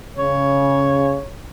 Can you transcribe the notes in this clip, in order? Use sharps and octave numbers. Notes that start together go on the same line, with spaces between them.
C#3 C#5